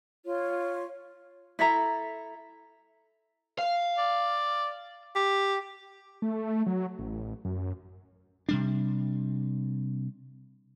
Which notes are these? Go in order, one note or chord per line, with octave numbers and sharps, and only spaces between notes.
F4 C#5
E4 A4 E5 A#5
F5
D5
G4
A3
F#3
A1
F#2
C3 G3 D4